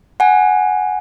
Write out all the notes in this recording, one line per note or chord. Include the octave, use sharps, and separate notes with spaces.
F#5 G#5